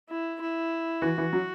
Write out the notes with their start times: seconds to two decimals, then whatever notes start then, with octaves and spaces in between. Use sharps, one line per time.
0.09 E4
0.41 E4
1.02 E3 F#4
1.18 E3
1.33 F#3